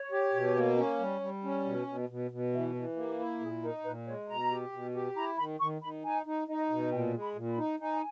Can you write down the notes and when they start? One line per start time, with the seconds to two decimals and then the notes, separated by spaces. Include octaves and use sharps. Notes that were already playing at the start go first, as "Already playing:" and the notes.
Already playing: C#5
0.12 G4
0.33 B2
0.56 A#3
0.77 C#4
0.99 G3
1.21 G3
1.44 C#4
1.65 B2
1.87 B2
2.09 B2
2.31 B2
2.53 E3 E5
2.75 E3
2.96 A#3 G4
3.19 E4
3.40 A#2 G#4
3.62 D#4 A#4
3.84 A#2 B4
4.07 G#3 C#5
4.29 B2 A#5
4.51 G4
4.72 B2
4.95 G4
5.16 E4 A#5
5.37 D#3 B5
5.60 D#3 C#6
5.82 D#3 B5
6.04 D#4 G#5
6.26 D#4
6.48 D#4 D#5
6.70 B2
6.91 A#2 G5
7.14 G#3
7.21 B5
7.35 A#2
7.50 B5
7.58 D#4
7.80 D#4 G#5